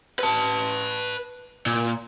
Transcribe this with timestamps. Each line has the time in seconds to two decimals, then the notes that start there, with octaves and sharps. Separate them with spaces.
0.19 B4 A5
1.66 A#2